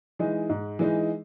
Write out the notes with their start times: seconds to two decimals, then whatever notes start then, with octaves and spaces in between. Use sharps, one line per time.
0.19 E3 G#3 D#4
0.49 G#2
0.79 E3 G#3 D#4